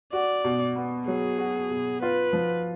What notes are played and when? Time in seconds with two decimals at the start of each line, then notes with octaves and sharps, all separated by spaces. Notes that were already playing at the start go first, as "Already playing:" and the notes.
0.13 F#4 D5
0.44 B2
0.76 B3
1.08 F#3 G#4
1.38 F#4
1.70 B2
2.02 F4 B4
2.33 F3